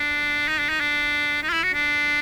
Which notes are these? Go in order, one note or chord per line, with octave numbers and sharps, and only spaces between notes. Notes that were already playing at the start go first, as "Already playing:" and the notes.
Already playing: D4
D#4
D4
D#4
D4
D#4
F4
E4
F#4
D4